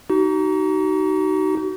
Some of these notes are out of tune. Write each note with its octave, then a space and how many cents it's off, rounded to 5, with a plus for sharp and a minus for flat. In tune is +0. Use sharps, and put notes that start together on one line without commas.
D#4 +0 F#4 +40